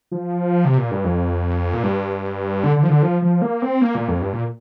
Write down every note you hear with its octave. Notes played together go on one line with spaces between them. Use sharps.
F3
C3
A#2
G2
F2
A#2
G2
D3
D3
F3
D3
F3
F3
A#3
C4
A#3
A#2
F2
G2
A#2